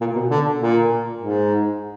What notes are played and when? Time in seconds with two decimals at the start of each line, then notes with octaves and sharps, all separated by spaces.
0.01 A#2
0.15 B2
0.30 D3
0.59 A#2
1.19 G#2